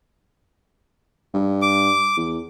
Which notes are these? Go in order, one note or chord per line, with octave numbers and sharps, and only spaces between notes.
G2
D6
E2